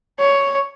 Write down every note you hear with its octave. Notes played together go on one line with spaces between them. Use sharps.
C#5